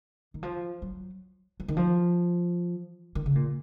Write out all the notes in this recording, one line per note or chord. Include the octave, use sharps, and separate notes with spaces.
D#3
F3
F#3
F3
D#3
F3
D#3
C#3
A#2